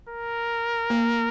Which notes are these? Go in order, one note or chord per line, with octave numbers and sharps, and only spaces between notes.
A#4
A#3